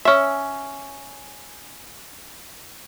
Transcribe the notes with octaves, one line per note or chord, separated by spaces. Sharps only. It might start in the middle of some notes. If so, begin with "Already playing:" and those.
C#4 E5